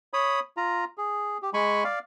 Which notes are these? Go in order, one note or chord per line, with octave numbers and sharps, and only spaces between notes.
C#5 B5 D#6
F4 A#5
G#4
G4
G#3 G#5 B5 C#6
D5 F5